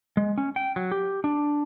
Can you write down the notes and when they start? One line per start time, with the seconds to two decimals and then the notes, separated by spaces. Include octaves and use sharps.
0.17 G#3
0.38 C#4
0.56 G5
0.76 F#3
0.92 G4
1.24 D4